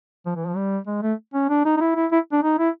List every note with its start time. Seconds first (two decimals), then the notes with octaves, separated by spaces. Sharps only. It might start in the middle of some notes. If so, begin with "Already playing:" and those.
0.26 F3
0.36 E3
0.46 F3
0.56 G3
0.87 G#3
1.02 A3
1.34 C#4
1.49 D4
1.65 D#4
1.77 D#4
1.81 E4
1.96 E4
2.12 E4
2.32 D4
2.43 D#4
2.59 E4